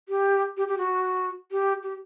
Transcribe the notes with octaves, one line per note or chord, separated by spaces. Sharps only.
G4
G4
G4
F#4
G4
G4